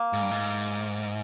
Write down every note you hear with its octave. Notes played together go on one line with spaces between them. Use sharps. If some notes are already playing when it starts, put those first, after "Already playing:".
Already playing: A#3
G#2
G2
G#2